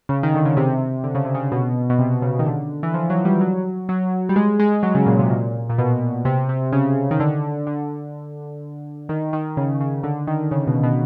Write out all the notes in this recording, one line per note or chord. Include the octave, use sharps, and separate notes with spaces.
C#3
D#3
D3
C#3
C3
D3
C#3
C3
C#3
B2
B2
C3
C#3
D#3
D3
E3
F3
F#3
G3
F#3
F#3
G3
G#3
G#3
F#3
C#3
A#2
C3
A#2
A#2
B2
C3
C3
C#3
D#3
D3
D3
D#3
D#3
C#3
C#3
D3
D#3
C#3
B2
B2